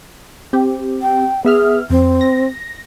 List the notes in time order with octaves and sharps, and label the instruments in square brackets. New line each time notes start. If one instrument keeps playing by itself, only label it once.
[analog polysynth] C4 G4
[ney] G5
[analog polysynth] B3 E5 F6 [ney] G#4
[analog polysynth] F2 [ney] C4
[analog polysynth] A#6